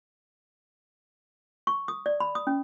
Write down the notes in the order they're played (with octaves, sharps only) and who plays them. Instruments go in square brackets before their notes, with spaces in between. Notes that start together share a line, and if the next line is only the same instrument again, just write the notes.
[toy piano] C#6
D#6
D5
B5
D#6
C#4